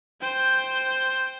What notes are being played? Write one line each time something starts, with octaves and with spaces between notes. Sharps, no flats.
C5 G5